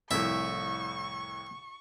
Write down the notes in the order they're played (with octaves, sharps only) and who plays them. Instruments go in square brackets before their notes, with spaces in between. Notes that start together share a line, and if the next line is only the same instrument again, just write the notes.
[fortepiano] C2 F2 A2 [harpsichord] E5 [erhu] C#6